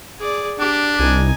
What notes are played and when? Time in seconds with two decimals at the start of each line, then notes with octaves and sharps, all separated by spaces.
0.19 G#4 D5
0.59 D4 G4
0.99 C2 D#4 G#5